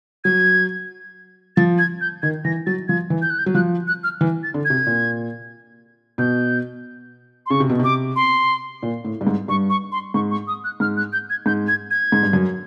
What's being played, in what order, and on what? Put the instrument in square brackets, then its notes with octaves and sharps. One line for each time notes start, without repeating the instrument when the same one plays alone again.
[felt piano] F#3 [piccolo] G#6
[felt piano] F3 [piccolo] A6
[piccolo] G#6
G6
[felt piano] D#3 [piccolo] G#6
[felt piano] E3 [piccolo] A#6
[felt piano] F#3 [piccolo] A6
[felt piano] F3 [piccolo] G#6
[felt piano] E3
[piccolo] G6
F#6
G6
[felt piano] F#3
[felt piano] F3 [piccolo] F#6
[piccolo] F#6
F6
[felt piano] E3
[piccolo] A6
[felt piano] D3
[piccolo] G#6
[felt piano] C3
A#2
[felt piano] B2 [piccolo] G6
[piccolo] C6
[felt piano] C#3 [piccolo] C#6
[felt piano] C3
B2
[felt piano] C3 [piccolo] D6
[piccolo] C6
[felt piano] A#2
A2
G2
G#2
[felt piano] G2 [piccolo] C#6
[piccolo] C#6
C6
[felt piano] G#2 [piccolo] C#6
[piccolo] C#6
D#6
F#6
[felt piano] G#2 [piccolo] F6
[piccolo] F#6
G6
G#6
[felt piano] G#2 [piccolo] G6
[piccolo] G#6
G#6
[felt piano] G#2
G2
F#2